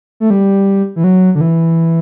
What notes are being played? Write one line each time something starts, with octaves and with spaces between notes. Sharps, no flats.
A3
G3
E3
F#3
D3
E3